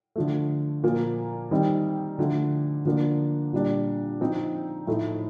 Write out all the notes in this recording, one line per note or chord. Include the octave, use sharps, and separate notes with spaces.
D3 F3 A3
A#2 F3 A#3
D#3 G3 C4 D#4
D3 F3 A3
D3 F3 A#3 D4
A#2 G3 D4
F3 C4 D#4
A2 F3 A3 D#4